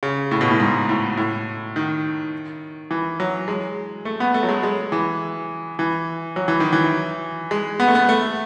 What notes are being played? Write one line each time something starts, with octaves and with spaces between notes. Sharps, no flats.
C#3
A2
B2
A2
G#2
A2
A2
D#3
E3
F#3
G#3
A3
B3
A3
F#3
G#3
G#3
E3
E3
F#3
E3
D#3
E3
G#3
B3
A3
B3
A3